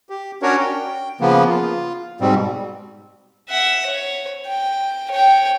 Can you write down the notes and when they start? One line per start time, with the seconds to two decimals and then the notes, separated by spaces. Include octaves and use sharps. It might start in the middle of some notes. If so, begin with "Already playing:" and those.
0.10 G4
0.42 C#4 D4 F#4 A#4 C#5
0.59 G5
1.21 C#3 F3 A#3 B3
1.49 F4
2.21 G#2 B2 G3 C4
3.49 E5 F#5
3.86 C#5
4.48 G5
5.11 C#5 G5